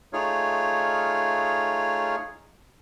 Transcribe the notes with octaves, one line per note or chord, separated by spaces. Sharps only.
A3 D#4 F4 G#4 C#5 F6